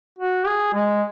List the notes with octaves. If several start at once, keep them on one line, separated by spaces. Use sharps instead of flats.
F#4
G#4
G#3